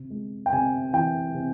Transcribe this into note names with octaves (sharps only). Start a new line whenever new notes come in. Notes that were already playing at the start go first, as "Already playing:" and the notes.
Already playing: C3
G#3
G5
C3 G#5
E3 G5
C3